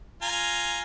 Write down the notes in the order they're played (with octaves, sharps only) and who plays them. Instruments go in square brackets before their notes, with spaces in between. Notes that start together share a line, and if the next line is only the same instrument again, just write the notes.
[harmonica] F4 G#5 A#5